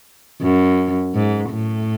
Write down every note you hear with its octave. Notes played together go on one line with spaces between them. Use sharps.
F#2
G#2
A2